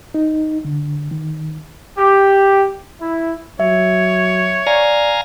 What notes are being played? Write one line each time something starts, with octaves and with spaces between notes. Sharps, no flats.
D#4
D3
D#3
G4
E4
F#3 C#5 E5
D5 F5 G#5 A#5